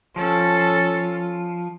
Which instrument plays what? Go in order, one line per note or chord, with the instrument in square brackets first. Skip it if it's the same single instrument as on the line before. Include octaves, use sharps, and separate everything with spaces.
[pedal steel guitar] F3 [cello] C#4 A4